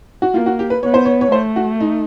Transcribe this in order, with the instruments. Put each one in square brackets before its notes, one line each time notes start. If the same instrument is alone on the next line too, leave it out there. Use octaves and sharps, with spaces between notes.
[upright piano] F#4
[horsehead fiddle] A#3 [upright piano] F4
[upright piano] F#4
G4
B4
[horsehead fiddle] B3 [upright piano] C#5
[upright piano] C5
C#5
C#5
[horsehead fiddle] A3 [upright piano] C5
[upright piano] F#4
D#4